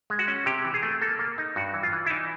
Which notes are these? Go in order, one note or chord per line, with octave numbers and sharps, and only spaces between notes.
G#3
F#4
C#4
C3 G4
E3
G#4
A3
A#3 A4
A#3
D#4
G2 F#4
E3
F4
E3
E4
E3 D#4